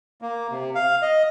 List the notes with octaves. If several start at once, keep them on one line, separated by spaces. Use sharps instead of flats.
A#3
C3
F5
D#5